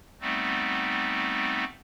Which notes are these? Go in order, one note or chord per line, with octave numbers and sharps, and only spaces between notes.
G3 A3 B3 C4 D#4